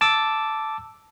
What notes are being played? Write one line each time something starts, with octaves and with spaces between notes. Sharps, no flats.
A5 D6 E6